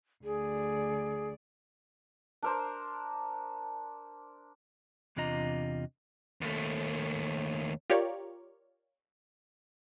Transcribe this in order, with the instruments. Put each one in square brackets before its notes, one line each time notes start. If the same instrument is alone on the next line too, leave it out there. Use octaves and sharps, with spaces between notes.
[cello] D2 D5 [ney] G#4
[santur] D4 A#4 C5
[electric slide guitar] E2 C3 D4 F4 D#5 A#5
[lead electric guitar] D#2 A3
[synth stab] F4 G4 A#4 C#5 D5